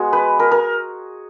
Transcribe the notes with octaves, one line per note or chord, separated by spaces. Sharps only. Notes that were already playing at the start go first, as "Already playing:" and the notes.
Already playing: G#3 B3 F#4 G#4
B4
A#4
A#4